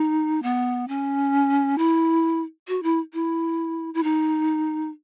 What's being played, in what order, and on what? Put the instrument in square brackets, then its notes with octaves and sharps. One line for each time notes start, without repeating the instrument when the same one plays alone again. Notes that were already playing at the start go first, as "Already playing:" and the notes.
Already playing: [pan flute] D#4
B3
C#4
E4
F#4
E4
E4
E4
D#4